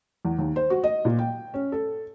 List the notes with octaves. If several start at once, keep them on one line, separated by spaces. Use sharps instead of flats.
E2
D#2
C5
F#4
D#5
A#2
G5
C#4
A4